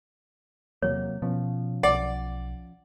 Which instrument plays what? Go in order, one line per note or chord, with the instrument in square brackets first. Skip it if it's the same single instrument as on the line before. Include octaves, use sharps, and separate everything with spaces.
[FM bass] E2 [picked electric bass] C3 F#3 A#3 [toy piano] C#5
[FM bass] B2 [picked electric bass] F3 C#4
[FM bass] B1 [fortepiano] D5 [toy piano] F#5